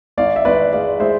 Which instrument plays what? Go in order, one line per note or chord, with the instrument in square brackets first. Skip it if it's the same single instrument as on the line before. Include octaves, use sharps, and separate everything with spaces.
[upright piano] G#1 [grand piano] D5 F5
[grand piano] E5
[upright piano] G#1 [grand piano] B4 D5
[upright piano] G#3 [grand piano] D5 F5
[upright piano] G#3 [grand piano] C5 E5